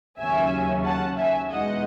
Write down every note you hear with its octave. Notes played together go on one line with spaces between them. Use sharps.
D#2 C#3 F#3 C#4 E5 G#5
F#5 A5
E5 G#5
E2 B2 G#3 D#4 D#5 F#5